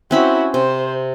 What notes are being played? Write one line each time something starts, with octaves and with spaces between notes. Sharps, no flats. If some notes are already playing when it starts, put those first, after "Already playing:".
C4 C#4 E4 F#4 B5
C3 C5